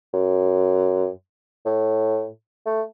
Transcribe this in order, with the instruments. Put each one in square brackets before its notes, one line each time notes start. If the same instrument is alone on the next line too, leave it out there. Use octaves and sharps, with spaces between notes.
[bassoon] F#2
A2
A3